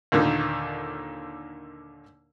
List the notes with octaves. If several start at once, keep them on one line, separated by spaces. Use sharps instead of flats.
D#2 A#2 D3 D#3